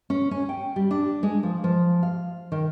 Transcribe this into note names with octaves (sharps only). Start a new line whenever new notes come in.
C#4
C#4
G5
G3
D4
G#3
F3
F3
F5
D#3